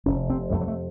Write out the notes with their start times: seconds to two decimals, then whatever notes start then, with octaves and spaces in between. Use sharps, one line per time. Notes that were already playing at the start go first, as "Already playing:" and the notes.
0.06 F1 C#4
0.30 C3 C4
0.52 F2 A3
0.61 F#3
0.68 A3